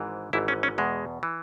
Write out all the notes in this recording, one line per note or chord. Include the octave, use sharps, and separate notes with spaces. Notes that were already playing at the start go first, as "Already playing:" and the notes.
Already playing: G#1 G#2 E3
G#1 G#2 E3 E4
C#4
C#4
E2 B2 G#3
E3